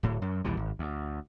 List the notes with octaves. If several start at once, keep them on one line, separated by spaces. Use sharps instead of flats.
D1 A2
F#2
A#1 D#2 E3 G3
G#1
D2